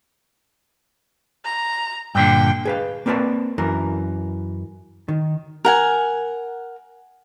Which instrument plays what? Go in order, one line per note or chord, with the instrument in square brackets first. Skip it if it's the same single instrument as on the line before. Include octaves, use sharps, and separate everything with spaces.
[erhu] A#5
[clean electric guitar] G2 A#2 D3 [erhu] G5
[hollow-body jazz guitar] G#4 B4 F5
A#3 C4 A#4 B4 D5 A5
F#2 E3 A#4
D#3
[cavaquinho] A#4 F#5 G#5